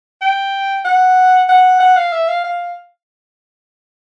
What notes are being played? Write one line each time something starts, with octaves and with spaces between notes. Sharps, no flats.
G5
F#5
F#5
F#5
F5
E5
F5
F5